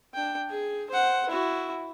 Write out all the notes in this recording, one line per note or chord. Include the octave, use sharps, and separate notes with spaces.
D4 G5
G#4
C5 F#5
E4 F#4